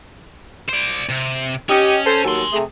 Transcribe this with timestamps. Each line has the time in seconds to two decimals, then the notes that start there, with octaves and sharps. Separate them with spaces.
0.69 C5 D5
1.09 C3
1.69 C#4 G4 D#5
2.06 A4 C5
2.25 D#2 F#3 A4 G#5 C6
2.53 C3 A3 G#4